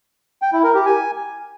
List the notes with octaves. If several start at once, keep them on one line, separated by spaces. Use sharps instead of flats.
G5
E4
A#4
G4
G#5